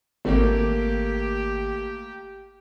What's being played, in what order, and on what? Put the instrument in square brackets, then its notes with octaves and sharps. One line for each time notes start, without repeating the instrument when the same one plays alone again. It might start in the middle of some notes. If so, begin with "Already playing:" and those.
[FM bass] G#1 [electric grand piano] A3 A#3 [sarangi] G4